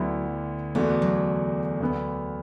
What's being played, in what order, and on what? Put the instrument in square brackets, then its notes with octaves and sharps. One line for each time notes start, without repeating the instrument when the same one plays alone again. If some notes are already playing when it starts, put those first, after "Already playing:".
Already playing: [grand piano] D2 D3 B3 E4 [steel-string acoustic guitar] F#3
[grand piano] E2 D3 A3 D4 F#4 [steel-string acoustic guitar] B3
[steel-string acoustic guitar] F#3
[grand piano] D2 D3 B3